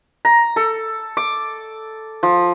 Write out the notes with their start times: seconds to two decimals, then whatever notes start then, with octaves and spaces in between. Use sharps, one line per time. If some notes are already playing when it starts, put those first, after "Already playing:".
0.25 A#5
0.56 A4
1.17 D6
2.23 F3